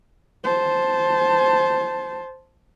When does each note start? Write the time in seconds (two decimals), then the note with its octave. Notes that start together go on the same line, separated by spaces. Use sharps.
0.44 C5 A5